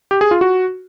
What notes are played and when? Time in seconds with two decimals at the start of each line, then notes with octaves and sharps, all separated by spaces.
0.11 G4
0.21 G#4
0.31 F4
0.41 F#4